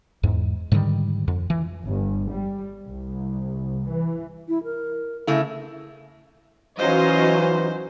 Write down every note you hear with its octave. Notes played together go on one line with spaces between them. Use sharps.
E2 G#2
G#2 D3 D#3 G3
F2
E3
G1
G3
C2
E3
E4
A#4
C#3 A3 E4
E3 F#3 C#4 D#4 F4 C5 D#5